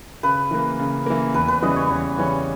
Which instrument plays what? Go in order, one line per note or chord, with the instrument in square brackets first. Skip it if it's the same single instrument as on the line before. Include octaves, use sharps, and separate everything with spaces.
[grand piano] C#3 [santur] B4
[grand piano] E3 A#3
C#3
E3 A#3
[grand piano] E2 [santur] B4
[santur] B4
[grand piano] C#3 E3 G3 C#4 [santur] D#5
[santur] C#5
[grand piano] E2
C#3 E3 G3 C#4